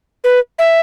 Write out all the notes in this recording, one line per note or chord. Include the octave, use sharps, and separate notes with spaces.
B4
E5